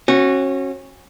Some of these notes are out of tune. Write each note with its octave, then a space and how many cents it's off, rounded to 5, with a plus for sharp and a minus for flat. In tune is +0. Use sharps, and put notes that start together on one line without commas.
C#4 -30 F#4 +0